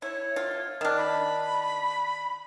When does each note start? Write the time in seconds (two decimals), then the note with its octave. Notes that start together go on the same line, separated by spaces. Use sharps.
0.02 E4 C#5
0.36 F4
0.81 D#3 D4 F6
0.97 B5